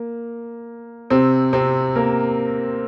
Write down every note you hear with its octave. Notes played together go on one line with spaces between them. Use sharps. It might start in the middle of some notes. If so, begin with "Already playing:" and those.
Already playing: A#3
C3 C4
C3 C4
A#3 A#4